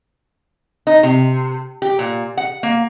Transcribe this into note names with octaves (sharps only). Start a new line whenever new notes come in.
D#4
C3
G4
A#2
F#5
A#3